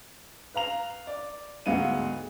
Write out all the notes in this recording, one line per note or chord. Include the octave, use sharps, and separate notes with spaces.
B4 F5 A#5 F7
D5
D2 G#2 G#3 B3 F5 D#7